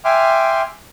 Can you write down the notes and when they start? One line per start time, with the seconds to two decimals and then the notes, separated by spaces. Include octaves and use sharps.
0.05 E5 G5 G#5 C6 D6 F6